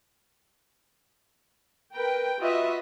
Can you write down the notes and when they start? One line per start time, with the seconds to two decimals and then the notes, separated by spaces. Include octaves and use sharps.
1.94 A#4 B4 G5
2.40 F4 F#4 B4 D#5 E5